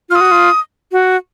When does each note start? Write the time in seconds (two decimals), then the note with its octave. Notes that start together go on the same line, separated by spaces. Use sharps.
0.10 F4 F6
0.16 D#6
0.21 F#4
0.31 F4
0.92 F#4